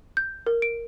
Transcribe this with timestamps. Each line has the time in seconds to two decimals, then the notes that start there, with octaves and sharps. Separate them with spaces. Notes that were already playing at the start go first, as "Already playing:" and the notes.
0.17 G6
0.47 A#4
0.62 D7